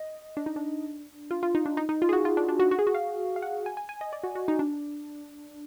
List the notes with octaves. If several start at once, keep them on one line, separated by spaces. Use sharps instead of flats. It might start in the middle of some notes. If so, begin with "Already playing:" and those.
Already playing: D#5
D4
D#4
D4
F4
F4
D#4
D4
D#4
D#4
F4
G#4
F#4
F4
D4
D4
F#4
F#4
G#4
F#4
F5
F5
F#5
G#5
G#5
G#5
D#5
D5
F#4
F#4
D#4
D4